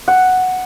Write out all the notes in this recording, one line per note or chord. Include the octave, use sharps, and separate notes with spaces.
F#5